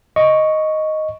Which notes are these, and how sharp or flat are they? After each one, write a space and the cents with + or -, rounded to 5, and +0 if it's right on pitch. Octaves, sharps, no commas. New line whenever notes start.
D#5 +0 C#6 +0